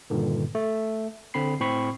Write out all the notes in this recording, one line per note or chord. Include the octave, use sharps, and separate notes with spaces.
G2 A#2 D3 D#3
A3
D3 C4 B5 C7
A2 C4 B5 C#6 C7